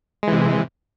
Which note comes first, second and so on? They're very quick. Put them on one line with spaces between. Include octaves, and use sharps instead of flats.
G#3 E3 C3